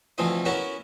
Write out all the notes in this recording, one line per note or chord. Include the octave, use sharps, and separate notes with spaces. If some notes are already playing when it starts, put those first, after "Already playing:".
D2 C3 E3 F3 F4 D#5
B3 C#4 E4 F#4 A#4